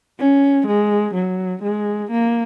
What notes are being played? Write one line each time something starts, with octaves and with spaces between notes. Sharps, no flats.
C#4
G#3
F#3
G#3
A#3